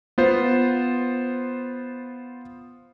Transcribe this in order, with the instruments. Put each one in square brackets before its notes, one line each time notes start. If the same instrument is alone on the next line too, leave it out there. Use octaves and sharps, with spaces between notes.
[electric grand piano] B3 F4 C5